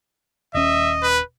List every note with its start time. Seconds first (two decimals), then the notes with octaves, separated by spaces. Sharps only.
0.54 D#1 C#4 D#5 E5
1.02 B4